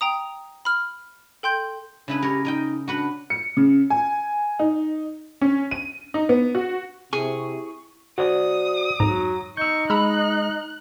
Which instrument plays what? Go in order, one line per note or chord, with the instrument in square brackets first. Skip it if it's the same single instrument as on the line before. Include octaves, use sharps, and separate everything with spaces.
[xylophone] G5 A#5 D#6
B5 F6
A4 G5 C6 G6
[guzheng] C#3 E4 B4 [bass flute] D4
[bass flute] G4 [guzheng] A#4 C#5
[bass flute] D#4 [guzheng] A#4 D#5 G5
[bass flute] D4 [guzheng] F#4 B4 F#5
[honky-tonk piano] C#7
C#3
G#5
D#4
C#4
D#7
D#4
B3
F#4
[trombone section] C3 [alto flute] E4 [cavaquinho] G#4 [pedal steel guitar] C#6
[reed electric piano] F#4 C5 D5 [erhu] D#6
[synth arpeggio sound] F2 G#2 [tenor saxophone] F#3 [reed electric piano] A#5
[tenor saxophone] D#4 [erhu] C#6 [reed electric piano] E6 G6
[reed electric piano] G#3 [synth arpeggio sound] A#5 B5 E6 [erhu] F#6